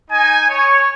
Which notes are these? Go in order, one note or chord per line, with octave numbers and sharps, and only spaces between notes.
D#4 G#5
C#5